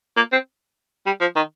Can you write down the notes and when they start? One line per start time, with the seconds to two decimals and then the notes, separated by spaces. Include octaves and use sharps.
0.17 A#3
0.32 C4
1.06 G3
1.21 F3
1.36 D#3